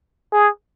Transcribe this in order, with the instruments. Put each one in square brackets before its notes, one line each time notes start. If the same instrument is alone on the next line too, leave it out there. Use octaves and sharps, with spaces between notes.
[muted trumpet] G#4